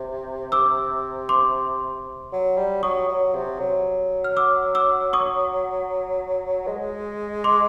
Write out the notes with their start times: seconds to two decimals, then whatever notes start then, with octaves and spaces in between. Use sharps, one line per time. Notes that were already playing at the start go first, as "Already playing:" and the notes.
Already playing: C3
0.52 D6 E6
1.29 C6 D6
2.32 F#3
2.57 G3
2.83 F#3 C#6 D#6
3.08 F#3
3.35 C3
3.59 F#3
4.24 F6
4.37 D6 E6
4.75 D6 E6
5.13 C#6 D#6
6.67 G#3
7.44 C6 D6